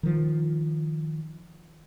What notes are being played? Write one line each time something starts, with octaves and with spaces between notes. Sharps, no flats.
D#3 F3